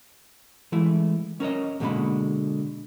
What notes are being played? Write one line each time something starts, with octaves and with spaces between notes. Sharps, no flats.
E3 G#3 A3 E4
C#4 A#4 C#5 D#5
D#2 B2 D3 G#3 A#3 B5